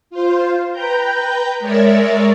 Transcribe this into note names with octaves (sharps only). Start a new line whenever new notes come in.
F4 C5
B4 G5 A#5 G6
G#3 A#4 C#5 D5 E5 A6